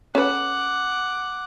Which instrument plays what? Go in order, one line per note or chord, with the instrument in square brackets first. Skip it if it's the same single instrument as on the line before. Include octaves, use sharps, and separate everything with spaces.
[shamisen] C#4 A4 B4 [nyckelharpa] F#5 D6